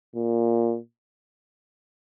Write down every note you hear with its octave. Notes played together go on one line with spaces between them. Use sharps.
A#2